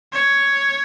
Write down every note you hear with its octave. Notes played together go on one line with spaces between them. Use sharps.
C#5